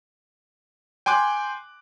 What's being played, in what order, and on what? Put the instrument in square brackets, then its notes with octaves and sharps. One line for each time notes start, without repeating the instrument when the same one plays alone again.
[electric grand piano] G5 G#5 C6 D6 F#6